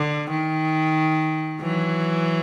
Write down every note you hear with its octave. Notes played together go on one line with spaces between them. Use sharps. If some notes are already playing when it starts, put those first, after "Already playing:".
Already playing: D3
D#3
E3 F#3